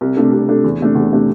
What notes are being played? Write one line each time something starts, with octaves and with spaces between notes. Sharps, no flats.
C2
C3 A3 D4 A4
C2
C3 A3 D4 A4
E2
C3 A3 D4
E2
C3 A3 D4